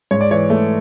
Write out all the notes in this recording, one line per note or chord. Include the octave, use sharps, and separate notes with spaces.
G#2 C#5
D5
E3 C#5
A3